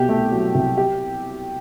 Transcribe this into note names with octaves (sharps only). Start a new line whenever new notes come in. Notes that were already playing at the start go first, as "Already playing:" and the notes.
Already playing: C2 B2 G4
A3
F#3
C2
G4